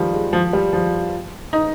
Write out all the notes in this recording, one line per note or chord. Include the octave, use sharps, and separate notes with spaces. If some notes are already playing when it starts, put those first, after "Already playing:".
Already playing: D#3 F3 G3
G#3
F3
G3
F3
D#4